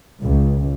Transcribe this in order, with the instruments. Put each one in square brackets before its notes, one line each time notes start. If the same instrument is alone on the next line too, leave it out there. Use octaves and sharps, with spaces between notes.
[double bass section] C#2